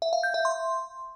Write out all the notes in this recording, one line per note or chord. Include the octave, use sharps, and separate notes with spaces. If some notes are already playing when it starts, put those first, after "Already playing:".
E5
F5
G6
E5
C6